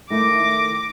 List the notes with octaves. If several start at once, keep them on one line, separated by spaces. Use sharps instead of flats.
D#3 A3 E4 D6 A#6